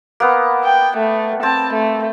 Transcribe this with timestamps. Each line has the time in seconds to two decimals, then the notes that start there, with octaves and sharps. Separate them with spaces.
0.20 A#3 B3
0.64 G5
0.97 A3
1.43 C4 A5
1.74 A3